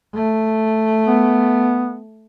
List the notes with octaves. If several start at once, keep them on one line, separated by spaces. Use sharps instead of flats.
A3
B3